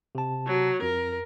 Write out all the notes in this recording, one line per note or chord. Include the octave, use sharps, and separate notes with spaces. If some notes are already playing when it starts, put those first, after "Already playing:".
C3 A5
F#3
F2 A#4